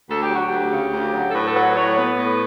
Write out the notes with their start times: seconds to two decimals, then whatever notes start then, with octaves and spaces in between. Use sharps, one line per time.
0.10 D2 A4
0.22 G4
0.31 F#3 F#4
0.46 G4
0.52 D2
0.72 C#3
0.92 D2
1.14 F#3
1.29 A4
1.34 A2 B4
1.47 A4
1.55 F#3 B4
1.76 A2 C#5
1.96 B3 B4
2.17 A2